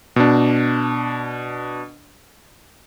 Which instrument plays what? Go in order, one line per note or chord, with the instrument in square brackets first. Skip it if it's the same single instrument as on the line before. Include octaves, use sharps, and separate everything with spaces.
[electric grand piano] B2 D4